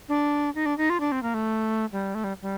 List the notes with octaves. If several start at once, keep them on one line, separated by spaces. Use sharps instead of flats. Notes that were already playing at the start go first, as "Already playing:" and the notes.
D4
D#4
D4
D#4
F4
D4
C4
A#3
A3
G3
A3
G3
G3